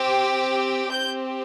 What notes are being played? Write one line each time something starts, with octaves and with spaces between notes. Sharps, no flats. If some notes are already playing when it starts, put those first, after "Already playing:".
Already playing: C4 G4
C4 G4 G6